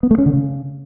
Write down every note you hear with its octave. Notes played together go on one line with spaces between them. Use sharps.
B3
A3
C#4
D3
C#3